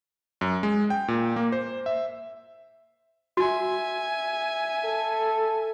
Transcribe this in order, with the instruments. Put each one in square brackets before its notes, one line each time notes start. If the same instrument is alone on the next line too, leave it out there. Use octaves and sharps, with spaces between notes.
[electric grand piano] F#2
G#3
G5
A#2
A#3
C5
E5
[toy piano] F#4 [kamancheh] E5 G#5
[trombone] A4